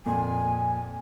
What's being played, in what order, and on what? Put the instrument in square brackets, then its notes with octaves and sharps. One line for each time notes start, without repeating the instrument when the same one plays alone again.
[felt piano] F2 A#2 [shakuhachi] G#5